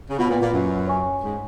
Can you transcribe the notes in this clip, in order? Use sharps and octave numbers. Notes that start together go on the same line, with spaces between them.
C#3
B2 F4 B4 F#5 B5
A#2
A#2
F#2
C#5 G#5 C#6
G#2